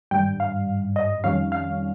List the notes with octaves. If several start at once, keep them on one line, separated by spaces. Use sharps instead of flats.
G#1 G2 G3 G5
F5
D#5
F2 D#3 G3 C#4 F5
F5